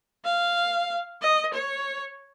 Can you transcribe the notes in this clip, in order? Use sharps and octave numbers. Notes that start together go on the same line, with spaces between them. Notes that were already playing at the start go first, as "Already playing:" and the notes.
F5
D#5
C#5